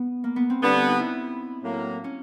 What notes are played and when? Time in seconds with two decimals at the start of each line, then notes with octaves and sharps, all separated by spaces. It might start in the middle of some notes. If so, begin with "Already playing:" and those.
Already playing: B3
0.24 A#3
0.36 B3
0.50 C4
0.62 D3 G3 B3 D4
0.74 D4
0.87 D#4
0.99 E4
1.62 A2 F#3 A#3
2.04 C#4